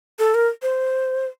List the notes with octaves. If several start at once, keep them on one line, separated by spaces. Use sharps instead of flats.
A4
A#4
C5